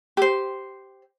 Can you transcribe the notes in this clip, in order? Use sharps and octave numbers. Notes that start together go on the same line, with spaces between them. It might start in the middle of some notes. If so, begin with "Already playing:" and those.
G4 C5